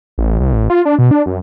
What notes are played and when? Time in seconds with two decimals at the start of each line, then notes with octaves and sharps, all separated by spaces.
0.18 A1
0.40 C2
0.53 A1
0.70 F4
0.85 D4
0.99 B2
1.11 D4
1.26 F#2